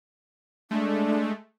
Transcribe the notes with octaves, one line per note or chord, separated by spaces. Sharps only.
G#3 A3 D4